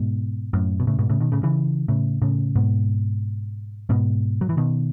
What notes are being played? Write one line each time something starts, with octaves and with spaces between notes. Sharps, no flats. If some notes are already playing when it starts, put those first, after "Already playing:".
Already playing: G#2 B2
F#2 A2
B2
A2 C#3
G#2 B2
A2 C#3
B2 D#3
A2 C#3
C#3 E3
A2 C#3
A2 C#3
G#2 B2
G#2 B2
F#3
E3
B2 D#3